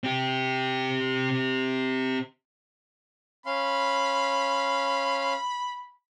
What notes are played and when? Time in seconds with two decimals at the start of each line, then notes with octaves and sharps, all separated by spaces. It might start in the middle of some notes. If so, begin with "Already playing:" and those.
0.04 C4 G4
3.46 C#4 F5 B5 C6